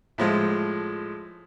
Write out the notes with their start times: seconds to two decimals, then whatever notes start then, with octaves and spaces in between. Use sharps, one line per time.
0.18 A2 F3 G#3